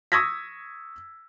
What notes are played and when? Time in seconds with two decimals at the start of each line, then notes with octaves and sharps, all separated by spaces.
0.12 C#6 D#6 E6 G#6 A#6 B6